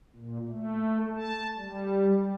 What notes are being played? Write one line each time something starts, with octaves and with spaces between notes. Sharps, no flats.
A#2
A3
A5
G3